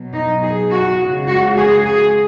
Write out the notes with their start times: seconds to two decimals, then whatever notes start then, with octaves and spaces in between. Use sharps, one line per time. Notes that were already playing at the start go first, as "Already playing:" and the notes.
Already playing: B2 F#3
0.14 D#4
0.43 G#4
0.71 F#4
1.00 C#3 G#3
1.29 F#4
1.58 G#4
1.86 G#4